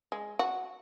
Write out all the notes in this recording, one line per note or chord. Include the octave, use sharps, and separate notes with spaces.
G#3
F#4